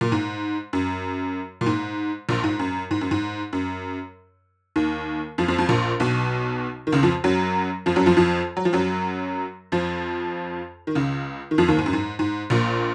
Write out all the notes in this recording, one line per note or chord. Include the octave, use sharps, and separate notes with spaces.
A#2
G#2
F#2
A#2
G#2
A#1 A#2
G#2
F#2
G#2
F#2
G#2
F#2
D#2 D#3
F2 F3
F2 F3
F2 F3
A#1 A#2
B1 B2
D#3
C#2 C#3
F2 F3
F#2 F#3
F2 F3
F#2 F#3
F2 F3
F2 F3
F#3
F3
F#2 F#3
F2 F3
D#3
C#2 C#3
D#3
F2 F3
D#2 D#3
G#2
F#2
G#2
G#2
A#1 A#2